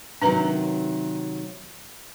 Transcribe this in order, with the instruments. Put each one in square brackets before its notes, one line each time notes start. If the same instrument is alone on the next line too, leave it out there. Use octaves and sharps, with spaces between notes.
[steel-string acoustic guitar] C3 D#3 F#3 [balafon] D4 B4 A#5